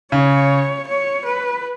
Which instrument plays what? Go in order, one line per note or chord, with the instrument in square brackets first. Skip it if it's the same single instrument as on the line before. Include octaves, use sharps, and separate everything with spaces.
[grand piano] C#3 [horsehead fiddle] C#5
[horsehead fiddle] C#5
B4